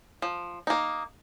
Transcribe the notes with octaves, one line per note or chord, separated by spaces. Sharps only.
F3
A#3 D#4